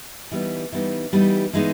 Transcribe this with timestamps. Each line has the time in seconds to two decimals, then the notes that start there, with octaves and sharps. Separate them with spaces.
0.31 E3 G3 B3 D#4
0.72 E3 G3 B3 D#4
1.13 E3 G3 B3 D#4
1.53 E3 G#3 B3 D#4